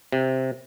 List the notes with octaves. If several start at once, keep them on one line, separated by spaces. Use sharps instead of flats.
C3